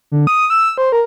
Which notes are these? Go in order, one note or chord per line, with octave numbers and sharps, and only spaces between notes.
D3
D#6
E6
C5
A#4